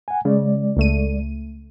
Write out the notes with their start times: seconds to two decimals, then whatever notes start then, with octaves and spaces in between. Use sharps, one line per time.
0.08 F#5 G#5
0.25 C#3 G#3 D5
0.77 C#2 A3 D#7